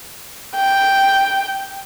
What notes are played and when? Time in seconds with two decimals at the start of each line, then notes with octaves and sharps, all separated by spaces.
0.56 G5